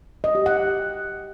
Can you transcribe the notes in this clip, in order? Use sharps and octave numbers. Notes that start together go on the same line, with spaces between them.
D#5
G4
F#5